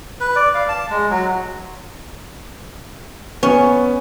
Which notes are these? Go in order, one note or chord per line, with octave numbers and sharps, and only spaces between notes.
B4
D5
F5
A5
G#3
F#3
B3 C#4